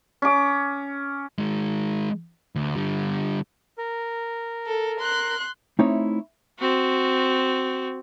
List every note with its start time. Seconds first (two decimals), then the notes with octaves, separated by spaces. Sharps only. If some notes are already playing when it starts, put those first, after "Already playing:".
0.22 C#4 D6
1.38 D#3 G#3
2.56 D2
2.76 D3 G3
3.78 A#4
4.66 A4
5.00 C6 F#6
5.79 A3 C4 D#4 E4 C#5
6.59 C4 F#4